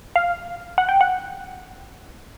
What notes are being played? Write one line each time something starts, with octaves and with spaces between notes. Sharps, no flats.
F5
F#5
G5
F#5